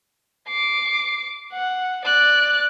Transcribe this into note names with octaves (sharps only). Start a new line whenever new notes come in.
D6 C7
F#5
D5 F#6